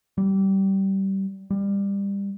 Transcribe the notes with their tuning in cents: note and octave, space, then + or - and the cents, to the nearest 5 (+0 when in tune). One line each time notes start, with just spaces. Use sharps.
G3 -20
G3 +25